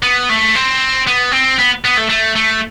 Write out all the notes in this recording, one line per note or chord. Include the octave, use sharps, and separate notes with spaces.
B3
A3
C4
B3
C4
B3
B3
A3
A3
A3